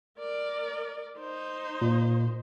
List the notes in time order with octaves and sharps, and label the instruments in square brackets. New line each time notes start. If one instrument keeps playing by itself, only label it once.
[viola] A#4 D5
D#4 C5
[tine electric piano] A#2